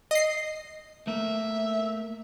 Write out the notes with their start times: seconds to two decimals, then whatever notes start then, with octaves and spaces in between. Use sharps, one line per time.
0.11 D#5 C7
1.07 A3 A#3 E5